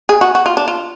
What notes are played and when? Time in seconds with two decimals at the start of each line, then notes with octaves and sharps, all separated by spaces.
0.09 G#4
0.21 F#4
0.35 F#4
0.46 F4
0.57 D4
0.68 F4